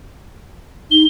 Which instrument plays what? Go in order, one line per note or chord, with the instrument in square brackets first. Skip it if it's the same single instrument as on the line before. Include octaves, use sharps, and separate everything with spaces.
[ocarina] D#4 [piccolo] G7